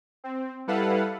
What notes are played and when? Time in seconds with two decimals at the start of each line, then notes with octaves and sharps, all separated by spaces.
0.24 C4
0.67 G3 E4 A4 B4 F5 F#5